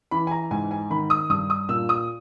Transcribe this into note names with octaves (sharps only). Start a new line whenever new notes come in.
E3 B5
G#5
A#5
G#2 G#5
G#5
D#3 B5
D#6
G2 D#6
D#6
A#2 E6
D#6